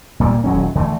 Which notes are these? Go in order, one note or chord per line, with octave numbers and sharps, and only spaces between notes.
A#2 G3 A#3
D#1 F#3 C#4
D3 E3 G#3 A3